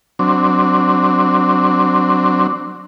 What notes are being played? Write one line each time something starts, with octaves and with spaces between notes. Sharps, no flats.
F#3 C4 D4